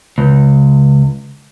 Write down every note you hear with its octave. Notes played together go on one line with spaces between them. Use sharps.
C#2